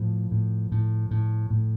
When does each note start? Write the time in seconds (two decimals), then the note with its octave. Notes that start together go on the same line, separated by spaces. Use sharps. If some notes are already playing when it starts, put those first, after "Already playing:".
Already playing: A2 F3
0.31 A2
0.72 A2
1.11 A2
1.50 A2